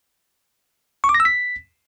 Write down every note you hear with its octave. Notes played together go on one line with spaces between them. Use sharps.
C#6
D6
A#6
E6
B6